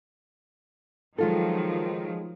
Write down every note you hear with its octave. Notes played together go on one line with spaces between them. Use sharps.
D#3 F3 F#3 G#3 F4 A4